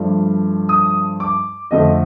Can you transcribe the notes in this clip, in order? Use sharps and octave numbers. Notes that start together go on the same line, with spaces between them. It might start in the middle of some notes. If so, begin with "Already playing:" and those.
Already playing: G2 F3 A3 D4
D#6
D6
F2 D3 A3 D#5